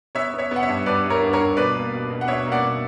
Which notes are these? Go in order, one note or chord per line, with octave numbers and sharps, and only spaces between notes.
B3 C#5 E5
B3
C#5 E5
B3
F#5
C#5 E5
G2
G2 B4 D5
G2
A#4 C#5
G2
A#4 C#5
G2
B2 B4 D5
A#3
B2
B2
F#5
B2 C#5 E5
A#3
D5 F#5
B2